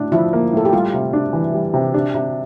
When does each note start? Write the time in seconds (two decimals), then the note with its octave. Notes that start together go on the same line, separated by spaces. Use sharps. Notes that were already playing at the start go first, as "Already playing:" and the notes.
Already playing: A2 D4
0.12 F3 E4
0.33 A#3
0.53 A2 A4
0.65 G4
0.73 G3 F4
0.94 C3
1.13 D4
1.33 E3
1.54 G3
1.74 C3
1.94 D4 G4
2.15 C3